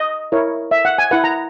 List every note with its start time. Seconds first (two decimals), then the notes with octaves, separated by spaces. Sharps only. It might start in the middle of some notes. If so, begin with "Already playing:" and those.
Already playing: D#5
0.32 E4 A#4 C#5
0.71 E5
0.85 F#5
0.98 G#5
1.11 E4 B4 F#5
1.24 A#5